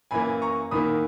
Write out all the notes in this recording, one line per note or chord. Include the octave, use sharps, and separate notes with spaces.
F#2 E3 A#3 G#5 B5
A#5 C#6
E2 D#3 A#3 B5 D#6